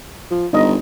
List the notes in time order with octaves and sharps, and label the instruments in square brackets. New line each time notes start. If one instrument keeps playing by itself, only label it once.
[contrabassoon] F3
[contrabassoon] G1 [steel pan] D#4 D#5